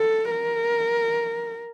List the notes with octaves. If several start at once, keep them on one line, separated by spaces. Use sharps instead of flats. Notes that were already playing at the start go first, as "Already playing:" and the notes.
Already playing: A4
A#4